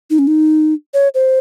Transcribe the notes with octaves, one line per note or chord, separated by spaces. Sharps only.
D#4
C#4
D#4
C#5
C5